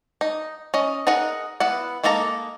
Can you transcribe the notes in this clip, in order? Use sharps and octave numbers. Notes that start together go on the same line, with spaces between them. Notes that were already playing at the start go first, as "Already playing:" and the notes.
D#4
C#4 D#5
D#4 G#4 A#4 D#5 F#5
B3 E4 F#5
G#3 A#3 D#4 A4 A#5